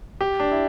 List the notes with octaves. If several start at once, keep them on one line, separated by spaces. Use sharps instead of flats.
G4
D4
E4